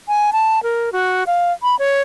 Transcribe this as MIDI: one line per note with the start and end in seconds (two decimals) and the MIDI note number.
0.08 0.31 80
0.33 0.62 81
0.63 0.92 70
0.93 1.24 66
1.27 1.52 77
1.63 1.78 83
1.79 2.02 73